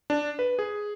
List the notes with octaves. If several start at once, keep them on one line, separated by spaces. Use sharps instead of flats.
D4
B4
G#4